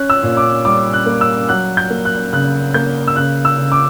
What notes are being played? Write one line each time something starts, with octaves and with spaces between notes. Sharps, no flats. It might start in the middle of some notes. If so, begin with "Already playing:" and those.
Already playing: C#4 F#6
E6
A#2
D6
G3 D6
F#6
A#3
E6
F#3 F#6
G6
A#3
F#6
C#3 F#6
A#3 G6
E6
C#3 F#6
E6
C#3
D6